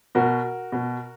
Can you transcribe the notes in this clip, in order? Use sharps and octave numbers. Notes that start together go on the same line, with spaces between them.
B2 F#4 A#4
B2